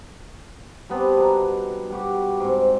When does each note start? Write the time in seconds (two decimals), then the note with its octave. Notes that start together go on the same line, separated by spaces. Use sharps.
0.90 G3 B3 C4 D4
1.17 B2 A#5
1.90 G3 F#4 G4
2.40 G#2 C4